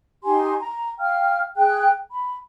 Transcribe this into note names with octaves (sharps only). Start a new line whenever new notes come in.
D#4 G4 G#5 C6
A#5
F5 G5 F6
G#4 G5 F#6
B5